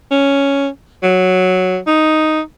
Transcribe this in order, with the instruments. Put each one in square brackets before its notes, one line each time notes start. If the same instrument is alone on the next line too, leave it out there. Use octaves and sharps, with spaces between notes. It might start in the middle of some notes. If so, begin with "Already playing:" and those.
[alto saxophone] C#4
F#3
D#4